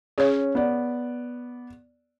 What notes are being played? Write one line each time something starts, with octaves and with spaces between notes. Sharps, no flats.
C#4 G#4 C#5
B3 D5